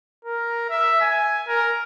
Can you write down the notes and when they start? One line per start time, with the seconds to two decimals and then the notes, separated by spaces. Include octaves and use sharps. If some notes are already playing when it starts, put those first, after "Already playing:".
0.25 A#4
0.70 E5
1.01 G#5
1.48 A#4